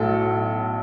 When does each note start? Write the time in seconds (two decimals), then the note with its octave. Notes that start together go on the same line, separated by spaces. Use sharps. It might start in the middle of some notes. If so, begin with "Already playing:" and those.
Already playing: B1 A2 F#3 A4